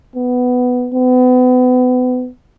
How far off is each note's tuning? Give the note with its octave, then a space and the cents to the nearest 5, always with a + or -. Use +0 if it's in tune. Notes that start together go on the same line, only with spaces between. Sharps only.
B3 +10
B3 +35